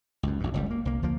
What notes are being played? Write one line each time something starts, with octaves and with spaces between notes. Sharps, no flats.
C#2 F#2
A#1 G2
F#1 C#2 G3
A#3
C2 A#3
D2 F3 A#3